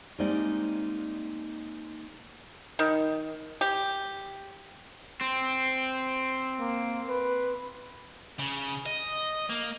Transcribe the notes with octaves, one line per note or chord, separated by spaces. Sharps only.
G3 G#3 A#3 C4 D#4 D5
D#3
G4
C4
A#3
B4
C#3
D#5
A#3